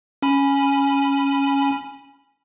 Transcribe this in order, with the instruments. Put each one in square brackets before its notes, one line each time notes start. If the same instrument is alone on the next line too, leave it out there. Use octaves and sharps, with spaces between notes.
[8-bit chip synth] C#4 G#5 B5